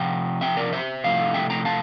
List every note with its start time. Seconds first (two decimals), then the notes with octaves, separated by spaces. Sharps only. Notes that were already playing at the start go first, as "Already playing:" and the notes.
Already playing: C3 F3 C4 G5 A#5
0.41 E5 G5
0.57 A#4 D5
0.73 C5 E5
1.04 C3 F3 A3 C4 E4 F5
1.34 E5 G5
1.50 G5 A#5
1.65 F5 A5